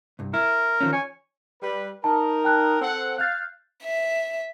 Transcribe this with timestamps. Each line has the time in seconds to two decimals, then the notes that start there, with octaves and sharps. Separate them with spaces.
0.19 C2 G2
0.34 E4 A#4
0.81 D#3 F3 C#4
0.93 C#5 G#5
1.62 G3 B4
2.04 D#4 A#4 A5
2.44 G5 A5 F#6
2.82 C4 A4 F#5
3.18 F5 F#6 G6 A6
3.84 E5